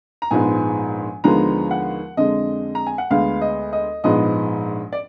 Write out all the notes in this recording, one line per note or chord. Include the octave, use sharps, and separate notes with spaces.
A#5
A#1 G#2 F3 G#3 B3 G#5
D#2 D3 F3 G#3 B3 A#5
F#5
F2 D3 G#3 D#5
A#5
G#5
F#5
D2 D3 G#3 B3 F5
D#5
D#5
A#1 G#2 F3 G#3 B3 D#5
D5